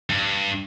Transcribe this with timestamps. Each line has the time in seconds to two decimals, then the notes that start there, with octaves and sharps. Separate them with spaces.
0.10 G2